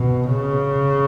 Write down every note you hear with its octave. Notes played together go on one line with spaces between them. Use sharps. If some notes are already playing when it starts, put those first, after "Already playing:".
Already playing: B2
C#3